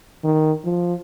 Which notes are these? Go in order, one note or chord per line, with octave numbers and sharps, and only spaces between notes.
D#3
F3